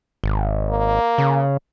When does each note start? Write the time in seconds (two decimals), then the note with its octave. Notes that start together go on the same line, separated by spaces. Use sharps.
0.24 G#1
0.69 A#3
1.18 C#3